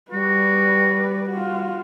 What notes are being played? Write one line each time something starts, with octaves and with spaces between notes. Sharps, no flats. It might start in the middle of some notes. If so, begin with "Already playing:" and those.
G3 F#4 B4 D5
F4 F#4